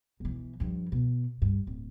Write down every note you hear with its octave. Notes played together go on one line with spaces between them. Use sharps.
B1 E3
G2 F3
B2
G2
D1